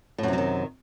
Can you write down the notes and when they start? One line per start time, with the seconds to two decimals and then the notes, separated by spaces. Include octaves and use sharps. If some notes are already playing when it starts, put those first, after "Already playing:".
0.18 A2
0.23 F#2
0.28 C3
0.33 F#3
0.38 D#3